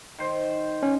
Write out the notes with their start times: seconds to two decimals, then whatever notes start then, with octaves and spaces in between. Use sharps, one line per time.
0.19 D#3 C5
0.83 C#4